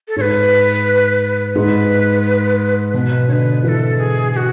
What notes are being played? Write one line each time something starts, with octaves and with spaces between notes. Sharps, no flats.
A4
G#2 B4 C#5
G#2 B4
B2 B4
D3 B4 C#5
E3 A4 B4
G#4
G#4
F#4